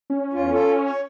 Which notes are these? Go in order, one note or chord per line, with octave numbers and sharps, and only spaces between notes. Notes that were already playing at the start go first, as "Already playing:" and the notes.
C#4
E2 F4
F4 A4
C#5